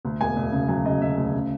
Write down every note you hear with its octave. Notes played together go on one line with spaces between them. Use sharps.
D2
E1 G#5
D2
C#3
F#3 G#5
C#3 D#5
D2 E5
D2
C#3